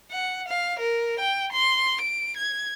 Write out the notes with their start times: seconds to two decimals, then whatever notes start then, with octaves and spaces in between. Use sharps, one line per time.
0.11 F#5
0.48 F5
0.79 A#4
1.20 G5
1.53 C6
2.01 D7
2.37 G#6